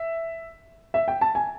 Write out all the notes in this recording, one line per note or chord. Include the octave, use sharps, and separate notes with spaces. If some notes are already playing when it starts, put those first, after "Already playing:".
Already playing: E5
E5
G5
A5
G#5